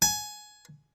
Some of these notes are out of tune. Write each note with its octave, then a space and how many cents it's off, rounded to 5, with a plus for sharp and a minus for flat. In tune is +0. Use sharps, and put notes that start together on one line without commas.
G#5 +20